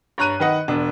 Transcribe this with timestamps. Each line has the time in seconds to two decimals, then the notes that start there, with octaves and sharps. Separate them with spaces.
0.18 G2 C#5 A#5 F#6 D#7
0.40 D#3 B4 D#5 F#5
0.68 E1 D4